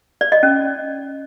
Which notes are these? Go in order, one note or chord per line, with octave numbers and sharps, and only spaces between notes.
D5
D#5
C#4